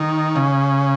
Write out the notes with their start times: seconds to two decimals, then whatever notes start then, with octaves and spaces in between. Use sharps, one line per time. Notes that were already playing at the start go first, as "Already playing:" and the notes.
Already playing: D#3
0.35 C#3